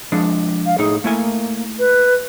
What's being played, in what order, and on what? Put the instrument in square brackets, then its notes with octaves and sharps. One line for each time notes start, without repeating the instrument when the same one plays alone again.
[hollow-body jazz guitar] F3 G#3 D4
[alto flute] F5
[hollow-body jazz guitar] A2 D#4 [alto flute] G#4
[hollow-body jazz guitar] A3 E4 G#5 [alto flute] A#3
[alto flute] B4